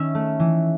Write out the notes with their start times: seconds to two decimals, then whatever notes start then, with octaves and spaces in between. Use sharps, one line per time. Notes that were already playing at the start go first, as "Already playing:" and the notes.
Already playing: D#3 C#4 E5
0.15 A3
0.39 E3